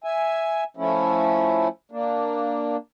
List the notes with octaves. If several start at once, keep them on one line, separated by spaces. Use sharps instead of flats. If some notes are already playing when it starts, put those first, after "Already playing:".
E5 G#5
F3 A3 C#4 E4
A#3 D4